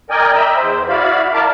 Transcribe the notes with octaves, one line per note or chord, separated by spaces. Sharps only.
A#4 D5 D#5 G5 G#5
D#5 E5 G5 A#5 B5 E6
E2 C5
E4 F#4 D5 F5 B5
E4 A#4 D5 F5 A5 D6